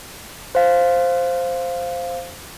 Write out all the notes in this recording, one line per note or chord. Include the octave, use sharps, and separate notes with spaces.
C5 F5